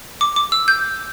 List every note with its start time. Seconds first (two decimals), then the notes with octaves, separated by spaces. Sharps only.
0.21 D6
0.36 D6
0.52 E6
0.68 G6